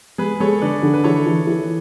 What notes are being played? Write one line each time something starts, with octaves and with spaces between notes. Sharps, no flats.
G#3 G#4 B4
G#3 A4 C#5
D3 B4 D5
D3
B4
E3 A4 C#5
E3
E3